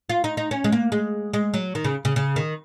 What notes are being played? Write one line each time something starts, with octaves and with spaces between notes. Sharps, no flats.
F4
D#4
D#4
C#4
G#3
A#3
G#3
G#3
F#3
D#3
C#3
C#3
C#3
D#3